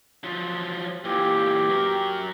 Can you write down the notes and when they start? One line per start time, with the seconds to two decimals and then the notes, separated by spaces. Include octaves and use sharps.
0.24 F3 F#3
1.05 A#2 E3 G4
1.69 F#3 A#4